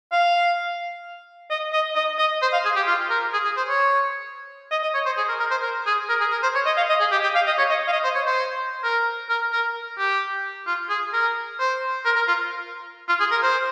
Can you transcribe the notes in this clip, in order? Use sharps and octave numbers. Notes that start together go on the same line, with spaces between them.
F5
D#5
D#5
D#5
D#5
C5
F5
G#4
G4
F4
A#4
G#4
G#4
C5
C#5
D#5
D#5
C#5
C5
G#4
A#4
A#4
C5
A#4
G#4
A#4
G#4
A#4
C5
C#5
D#5
F5
D#5
G#4
G4
G4
F5
D#5
C#5
D#5
F5
D#5
C5
C#5
C5
A#4
A#4
A#4
G4
F4
G#4
A#4
C5
A#4
A#4
F4
F4
G#4
A#4
C5